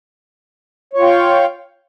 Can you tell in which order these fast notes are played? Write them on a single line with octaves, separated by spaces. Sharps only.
C#5 F4 G5 F5